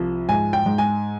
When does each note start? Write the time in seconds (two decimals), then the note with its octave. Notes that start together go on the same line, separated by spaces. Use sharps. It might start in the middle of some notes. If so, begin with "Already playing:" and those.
Already playing: C2 F3
0.29 G#2 G#5
0.53 G5
0.66 G#2
0.78 G#5